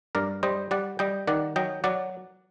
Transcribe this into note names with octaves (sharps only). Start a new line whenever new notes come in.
G2 A#4 D5
G3 C5 D#5
G3 D5 F#5
G3 D#5 G5
D#3 D5 F#5
F#3 D#5 G5
F#3 D5 F#5